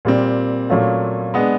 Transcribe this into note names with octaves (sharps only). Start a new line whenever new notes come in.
A#2 G3 C4
A#2 F#3 A3 C#4 F4
G#3 B3 D4